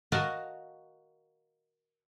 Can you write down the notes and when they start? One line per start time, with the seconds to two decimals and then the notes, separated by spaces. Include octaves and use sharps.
0.12 F#4 A#4 D#5 F5 F#5 A5